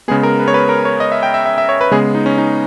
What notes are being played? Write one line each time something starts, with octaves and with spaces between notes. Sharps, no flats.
C#3 G#3 B3 G#4
A#4
B4
C#5
B4
A#4
C#5
D#5
E5
G5
E5
E5
E5
C#5
B4
C#3 G#3 B3 G#4
D#4
C#4
D#4